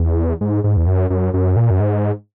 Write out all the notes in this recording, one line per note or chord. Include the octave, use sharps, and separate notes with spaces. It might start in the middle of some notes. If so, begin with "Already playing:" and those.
Already playing: E2
G#2
G#2
E2
F#2
F#2
F#2
A#2
F#2
G#2